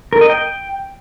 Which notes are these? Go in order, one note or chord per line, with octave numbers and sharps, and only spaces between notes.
A#4
D#5
G5